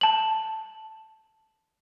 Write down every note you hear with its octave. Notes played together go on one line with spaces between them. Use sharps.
A5 F#7